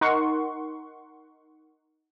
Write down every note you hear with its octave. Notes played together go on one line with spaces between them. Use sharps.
D#4 A#4 F#5 C6 C#6